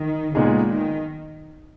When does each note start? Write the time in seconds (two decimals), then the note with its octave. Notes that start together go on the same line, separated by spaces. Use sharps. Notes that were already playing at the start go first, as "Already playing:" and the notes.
Already playing: D#3
0.35 A#2 C#3 G#3 B3 D#4 G#4
0.68 D#3